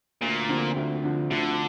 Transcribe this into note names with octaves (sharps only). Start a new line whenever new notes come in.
D2 A#2
D3 F3 C4
D2
D3 F3 C4
D2 D3